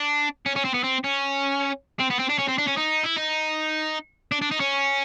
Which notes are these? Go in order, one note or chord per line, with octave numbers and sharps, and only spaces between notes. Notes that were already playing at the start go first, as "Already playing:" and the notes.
Already playing: D4
C#4
C#4
C4
B3
C4
C#4
C4
B3
C4
D4
C#4
C4
D4
C#4
D#4
E4
D#4
D4
D4
D#4
C#4